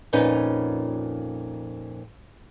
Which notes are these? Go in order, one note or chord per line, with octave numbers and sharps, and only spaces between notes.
F2 A#2 C#4 D#4 B4